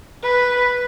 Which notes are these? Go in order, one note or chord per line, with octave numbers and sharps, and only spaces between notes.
B4